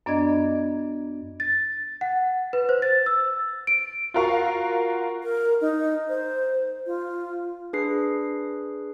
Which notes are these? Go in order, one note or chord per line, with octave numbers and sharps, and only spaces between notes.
F#2 B3 D4 D5 D#5 G#6
A6
F#5
B4
C5
A6
E6
D7
F4 F#4 A#4 F5 C#6
A#4
D#4
C5
F4
D4 G#4 B4 C7